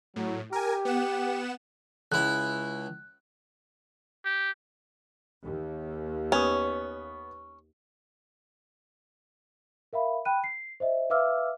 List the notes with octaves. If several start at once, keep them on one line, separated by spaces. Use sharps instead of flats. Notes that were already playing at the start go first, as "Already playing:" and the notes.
A2 F#3
G4 A#4 G#5
B3 F#5 E7
C#2 E4 F#6
G4
D#2
B3 C#4 D#6
A#4 E5 F5 B5
G5 B5 F#6 D#7
C7
C5 D#5 E5
B4 E5 F5 D6 E6 F6